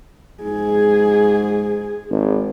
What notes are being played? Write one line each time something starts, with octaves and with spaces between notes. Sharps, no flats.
G#2 G#4
G#1